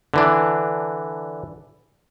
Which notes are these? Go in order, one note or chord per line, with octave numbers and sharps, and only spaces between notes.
D3 E3 D4